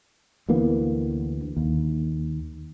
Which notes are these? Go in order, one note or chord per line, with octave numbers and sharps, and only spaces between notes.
D2 E3 A#3 B3
D#2